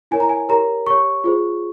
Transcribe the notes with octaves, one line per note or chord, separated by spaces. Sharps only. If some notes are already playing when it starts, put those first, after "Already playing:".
E4 A#4 C#5 G#5
A#5
G#5
G4 A#4 C#5 A#5
G4 C#5 C#6
F4 G#4 C5